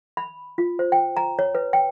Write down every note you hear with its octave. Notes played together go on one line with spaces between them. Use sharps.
B5
F4
C5
G5
A#5
C#5
B4
G5